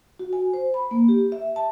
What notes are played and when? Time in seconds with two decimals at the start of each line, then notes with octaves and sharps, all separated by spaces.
0.19 F#4
0.33 G#5
0.54 C5
0.74 B5
0.91 A#3
1.08 G4
1.32 E5
1.56 A5